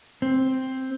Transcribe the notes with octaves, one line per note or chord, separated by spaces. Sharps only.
C4